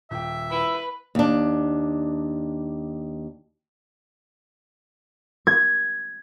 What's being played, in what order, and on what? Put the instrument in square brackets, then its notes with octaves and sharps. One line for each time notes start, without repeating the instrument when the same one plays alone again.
[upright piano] D#1 G5 [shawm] E5
[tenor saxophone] E4 [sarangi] B4
[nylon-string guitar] D#2 D4
[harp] G#6